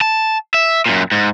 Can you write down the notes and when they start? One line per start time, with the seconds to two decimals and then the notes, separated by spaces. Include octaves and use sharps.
0.01 A5
0.54 E5
0.86 F#2 A#2
1.12 G#2